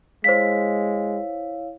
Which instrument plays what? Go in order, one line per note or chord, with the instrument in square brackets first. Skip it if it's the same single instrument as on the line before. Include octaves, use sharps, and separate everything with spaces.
[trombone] G#3 [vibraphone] E4 C#5 F5 [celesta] C5 B6